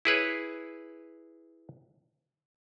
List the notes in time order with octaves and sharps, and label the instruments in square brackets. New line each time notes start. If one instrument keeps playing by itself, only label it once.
[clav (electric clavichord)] E4 G#4 B4 C#5